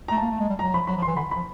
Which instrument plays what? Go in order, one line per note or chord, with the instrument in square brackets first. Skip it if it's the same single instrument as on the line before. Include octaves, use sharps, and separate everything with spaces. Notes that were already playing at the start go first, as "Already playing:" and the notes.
[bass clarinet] A3 [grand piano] A#5
[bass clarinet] A#3 [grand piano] A5
[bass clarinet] A3
G#3
G3
[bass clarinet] F#3 [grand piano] A#5
[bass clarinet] F3 [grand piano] B5
[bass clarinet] F#3 [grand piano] B5
[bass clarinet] F3
[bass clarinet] E3 [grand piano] C6
[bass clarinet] D3 [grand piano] B5
[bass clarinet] F3 [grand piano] B5